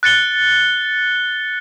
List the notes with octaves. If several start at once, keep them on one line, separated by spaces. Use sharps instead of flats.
F#6 A6 C#7 G7